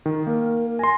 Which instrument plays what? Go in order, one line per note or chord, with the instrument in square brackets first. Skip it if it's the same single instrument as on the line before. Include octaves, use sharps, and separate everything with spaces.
[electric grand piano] D#3
[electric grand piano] A#3 [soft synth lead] A#4
[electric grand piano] G#5 C6 [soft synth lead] A#6